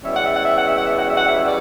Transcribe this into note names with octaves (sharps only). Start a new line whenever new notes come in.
E2 B2 G3 C#4 E5
F#5
E5
F#5
E5
F#5
E5
F#5
E5
F#5
E5
F#5
E5
D5